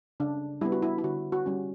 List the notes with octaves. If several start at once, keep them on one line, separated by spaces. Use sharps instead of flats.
C#3 D4
G3 B3 E4
F#4
E4
E4
D3 F#4
F#4
G3 C#4